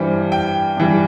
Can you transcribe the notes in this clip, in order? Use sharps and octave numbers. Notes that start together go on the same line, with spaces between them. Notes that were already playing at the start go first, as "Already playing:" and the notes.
Already playing: G2 E3 G3 C5
G5
G2 E3 G3